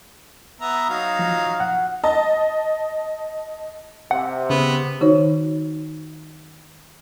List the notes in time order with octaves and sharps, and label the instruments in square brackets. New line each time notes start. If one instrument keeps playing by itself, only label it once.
[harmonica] B3 E5 A#5
F#3 D#4 F5
[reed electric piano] F3
F#5
[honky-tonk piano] D#5 A5
[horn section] C3 [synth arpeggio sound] F#5
[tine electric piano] C#3 [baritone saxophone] B3
[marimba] D#3 D#4 F#4 C5 C#5